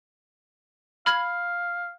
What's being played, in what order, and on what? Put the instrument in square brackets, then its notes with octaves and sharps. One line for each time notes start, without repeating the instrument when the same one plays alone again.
[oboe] F5 [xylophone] B5 F6 G#6